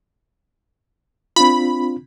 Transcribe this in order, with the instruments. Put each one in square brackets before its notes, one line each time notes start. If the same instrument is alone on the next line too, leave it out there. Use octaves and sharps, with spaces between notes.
[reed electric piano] C4 D4 F4 [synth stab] B5